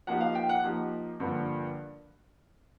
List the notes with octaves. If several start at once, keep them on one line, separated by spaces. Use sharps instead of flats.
F3 A#3 D#4 G4 F#5
F5
G5
F#5
F3 A#3 D#4 G4
G2 D3 F3 A#3